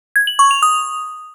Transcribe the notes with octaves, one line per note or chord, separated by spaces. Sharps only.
G#6
F#7
C#6
F7
D#6